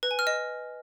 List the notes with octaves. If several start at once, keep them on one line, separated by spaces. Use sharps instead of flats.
B4
G#5
F6
D#5